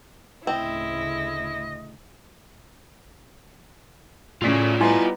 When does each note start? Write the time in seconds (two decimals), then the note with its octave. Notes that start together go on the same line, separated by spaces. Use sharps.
0.47 D2 A2 C#3 C4 E4 D#5
4.42 A2 C#3 F4 D5
4.81 G3 B3 D#4 E4 G#5 C6